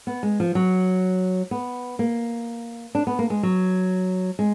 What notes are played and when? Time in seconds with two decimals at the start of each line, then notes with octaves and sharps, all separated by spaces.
0.07 B3
0.23 G#3
0.40 F3
0.55 F#3
1.51 B3
1.99 A#3
2.95 D4
3.07 B3
3.19 A#3
3.30 G#3
3.43 F#3
4.39 G#3